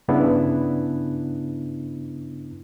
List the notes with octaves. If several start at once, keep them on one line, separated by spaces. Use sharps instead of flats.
G2 C#3 B3 D4 E4